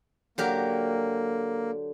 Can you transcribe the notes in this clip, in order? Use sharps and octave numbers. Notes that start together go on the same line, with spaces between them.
D3 F#3 A#3 G4 A#4